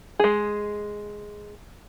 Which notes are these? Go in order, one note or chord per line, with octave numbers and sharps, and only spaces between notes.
G#3 G#4